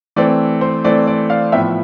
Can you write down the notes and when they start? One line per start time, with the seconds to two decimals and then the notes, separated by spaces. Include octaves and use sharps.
0.16 E3 A3 C4 D5
0.61 C5
0.84 E3 A3 C4 D5
1.07 D5
1.30 D5 F5
1.52 A2 F3 B3 E5 G5